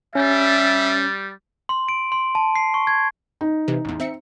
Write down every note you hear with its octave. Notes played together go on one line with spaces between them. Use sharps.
G3 C#4 E5
C6
D7
C6
A5
C7
C#6
G#6
D#4
C3 E3
A1 E2
C4 E5 C#7